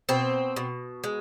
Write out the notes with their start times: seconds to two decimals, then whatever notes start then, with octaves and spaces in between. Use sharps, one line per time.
0.09 B2 C4
0.56 B2
1.04 G#3